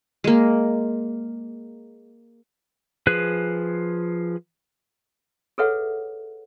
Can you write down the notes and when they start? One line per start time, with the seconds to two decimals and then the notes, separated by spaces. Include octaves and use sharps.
0.24 G#3 A#3
3.07 F3 G#4 B4 F#6
5.58 G#4 A4 B4 C#5 E5 F#5